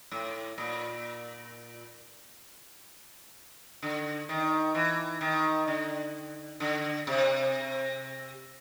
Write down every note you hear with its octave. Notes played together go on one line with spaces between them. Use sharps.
A2
A#2
D3
D#3
E3
D#3
D3
D3
C3